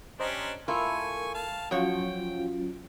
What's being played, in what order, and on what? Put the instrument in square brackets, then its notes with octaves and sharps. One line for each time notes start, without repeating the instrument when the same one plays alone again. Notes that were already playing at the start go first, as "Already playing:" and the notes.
[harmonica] C#4 D4 G4 [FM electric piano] C5 D#5 A#5
[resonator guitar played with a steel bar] A3 E4 F4 [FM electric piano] A#4 [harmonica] G#5 C#6
[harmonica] F5 A5
[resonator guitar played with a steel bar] F3 F#4 C#5 [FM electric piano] F#3 C#4 F4 [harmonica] G5